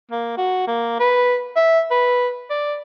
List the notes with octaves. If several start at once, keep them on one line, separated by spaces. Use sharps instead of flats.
A#3
F#4
A#3
B4
E5
B4
D5